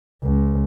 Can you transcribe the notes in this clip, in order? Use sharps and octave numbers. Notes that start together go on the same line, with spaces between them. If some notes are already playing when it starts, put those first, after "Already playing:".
C#2